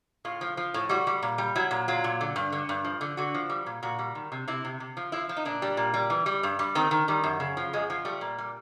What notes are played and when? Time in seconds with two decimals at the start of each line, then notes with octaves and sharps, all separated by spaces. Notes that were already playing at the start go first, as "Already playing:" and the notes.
0.25 A2 F4
0.41 F3
0.57 F3
0.74 A2
0.89 G3 F#4
1.07 G3
1.22 A#2
1.38 G3
1.55 F#3 E4
1.71 A#2
1.88 F#3 F4
2.04 A#2
2.21 D3
2.36 G2
2.52 D3
2.69 G2
2.85 F3
3.01 D3
3.17 D3 F#4
3.35 F3
3.50 G3
3.66 A#2
3.83 A#2 F#4
3.99 G3
4.15 D#3
4.32 C3
4.48 C3 E4
4.65 C3
4.80 C3
4.97 F3
5.12 F3 E4
5.29 F3
5.37 D#4
5.45 A#2 D4
5.62 G3
5.77 A#2
5.94 G3
6.10 E3
6.26 G3
6.43 G2
6.59 G3
6.75 D#3 C4
6.91 D#3
7.08 D#3 G3
7.24 F#2
7.40 C#3
7.57 F3
7.73 F#2 G#3
7.90 F3
8.05 G3 A3
8.21 A#2
8.38 G3